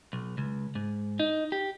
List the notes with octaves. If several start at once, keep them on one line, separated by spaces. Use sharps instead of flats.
B1
C#2
G#2
D#4
G4